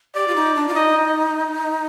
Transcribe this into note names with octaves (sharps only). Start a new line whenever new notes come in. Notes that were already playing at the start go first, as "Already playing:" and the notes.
G4 D5
F4
D#4
D4
F4
D#4 D#5